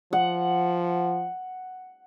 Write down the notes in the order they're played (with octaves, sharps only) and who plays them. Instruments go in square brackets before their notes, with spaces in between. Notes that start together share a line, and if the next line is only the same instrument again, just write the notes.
[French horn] F3 [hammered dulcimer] F#5